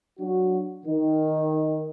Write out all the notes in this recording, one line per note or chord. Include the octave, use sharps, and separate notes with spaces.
F#3 D4 F#4
D#3